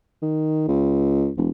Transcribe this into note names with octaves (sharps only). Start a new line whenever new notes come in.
D#3
C#2
E1